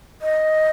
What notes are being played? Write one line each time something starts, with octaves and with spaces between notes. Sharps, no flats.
D#5